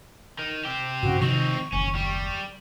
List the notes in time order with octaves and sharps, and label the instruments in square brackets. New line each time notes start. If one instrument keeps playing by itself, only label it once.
[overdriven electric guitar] D#3
C4 G4
[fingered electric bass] G2 C#3 [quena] F#4
[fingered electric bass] C3 D#3 F3 [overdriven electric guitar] C4 D#4 [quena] C#6
[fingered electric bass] F#1 D#2 [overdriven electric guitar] C#4
[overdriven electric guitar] G3